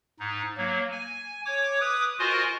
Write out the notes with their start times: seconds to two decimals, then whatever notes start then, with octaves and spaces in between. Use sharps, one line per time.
0.20 G#2 D#4
0.57 F#3 A#3
0.91 G#5
1.46 C#5 D6
1.81 B4 D6 D#6
2.19 F4 F#4 A#4 C5 D#5 G#5